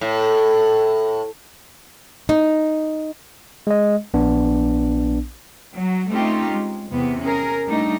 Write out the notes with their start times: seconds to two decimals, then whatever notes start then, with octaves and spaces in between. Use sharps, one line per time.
0.01 A2
2.29 D#4
3.67 G#3 D#5
4.14 A#1 B3 D4
5.74 F#3
6.10 A3 C4 C#4 D#4 F4 G4
6.52 G#3
6.92 E2 C3 B3
7.21 C#4 G#4 A#4
7.66 G3 A3 D4 D#4